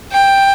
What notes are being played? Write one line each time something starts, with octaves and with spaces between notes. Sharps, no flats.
G5